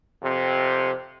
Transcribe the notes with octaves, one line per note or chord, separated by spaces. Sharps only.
F2 C3